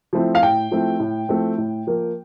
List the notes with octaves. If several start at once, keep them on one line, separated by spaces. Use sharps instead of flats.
F3 A3 C4 E4
F5
A2 G5
F3 A3 C4 E4
A2
F3 A3 C4 E4
A2
F3 A#3